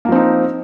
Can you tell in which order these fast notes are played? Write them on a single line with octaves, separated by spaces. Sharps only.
A#3 F3 C4 D#4